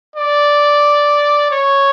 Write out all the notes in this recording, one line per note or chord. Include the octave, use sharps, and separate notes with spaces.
D5
C#5